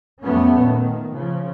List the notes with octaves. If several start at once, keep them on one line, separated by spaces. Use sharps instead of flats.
F2 G3 A3 B3 C#4
A#2 D#3
C#3 F3